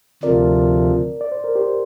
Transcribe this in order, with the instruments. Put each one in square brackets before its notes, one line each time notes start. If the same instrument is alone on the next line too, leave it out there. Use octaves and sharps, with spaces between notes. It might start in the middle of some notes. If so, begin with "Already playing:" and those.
[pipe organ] D2 C3 F3 [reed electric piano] A#4 D5
[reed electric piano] D5
C5
A#4
G4 C5